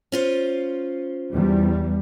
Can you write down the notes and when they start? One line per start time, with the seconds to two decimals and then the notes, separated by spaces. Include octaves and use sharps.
0.12 C#4 F4 C5
1.33 E2 G3